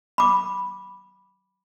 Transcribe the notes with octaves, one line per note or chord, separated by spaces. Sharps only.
B5 D6